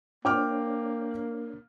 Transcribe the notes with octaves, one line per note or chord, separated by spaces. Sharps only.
A#3 D4 C5 C#5 G5 D6 F6